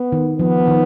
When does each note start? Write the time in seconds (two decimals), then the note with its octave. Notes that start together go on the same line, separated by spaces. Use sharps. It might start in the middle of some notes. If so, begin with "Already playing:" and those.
Already playing: B3
0.12 D#3
0.39 F3 B3
0.67 D#3